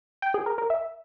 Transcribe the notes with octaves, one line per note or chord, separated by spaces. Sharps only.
G5
G#4
A#4
A#4
E5